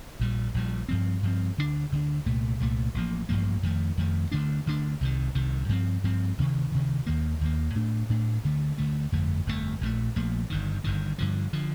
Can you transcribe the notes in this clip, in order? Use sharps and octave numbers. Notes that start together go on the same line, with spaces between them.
A#1 A#2 G3
A#1 A#2 G3
G2 F3 C4
G2 F3 C4
D2 D3 A3 D4
D2 D3 A3 D4
C2 A#2 A3
C2 A#2 A3
A1 G2 F3 A#3
A1 G2 F3 A#3
F2 D#3 A3
F2 D#3 A3
D2 D3 A3 D4
D2 D3 A3 D4
C2 C3 D#3
C2 C3 D#3
G2 F3 C4
G2 F3 C4
D2 C3 D#3
D2 C3 D#3
D#2 D#3 A#3
D#2 D#3 A#3
A2 A3 D4
A2 A3 D4
D2 D3 A3
D2 D3 A3
G1 F2 D3 A3
G1 F2 D3 A3
A#1 A#2 F3 A3
A#1 A#2 F3 A3
G1 G2 D#3
G1 G2 D#3
G2 D3 F3
D3 F3